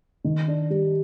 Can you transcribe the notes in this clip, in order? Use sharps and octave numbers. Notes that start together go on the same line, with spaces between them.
D#3
D4
G3